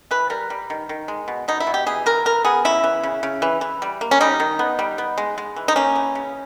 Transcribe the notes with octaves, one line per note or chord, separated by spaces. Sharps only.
E3 B4
G3 A#4
G3
D#3
D#3
G#3
B2
B2 D#4
E4
B2
G4
E3 G#4
E3 A#4
E3 A#4
B3 G#4
C#3 E4
E3
C#3
C#3
E3
E3
G3
A#3
C#4
G3 D#4
D#3
B3
G3
B3
G#3
G#3
E3
D#4
A#3 C#4
E3
C#3